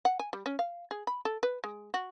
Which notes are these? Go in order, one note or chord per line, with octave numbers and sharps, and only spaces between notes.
F#5
G#5
G3
C#4
F5
G#4
B5
A4
B4
G#3
F#4